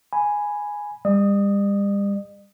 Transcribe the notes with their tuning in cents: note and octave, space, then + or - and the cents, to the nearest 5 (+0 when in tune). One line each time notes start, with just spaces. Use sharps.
G#5 +0 B5 +0
G3 +40 D5 +45 D#6 +0